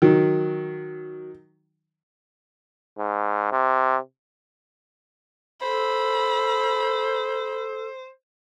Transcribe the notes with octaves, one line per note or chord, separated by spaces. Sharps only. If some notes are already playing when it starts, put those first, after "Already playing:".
D#3 F#3
G#2
C3
A4 C5 B5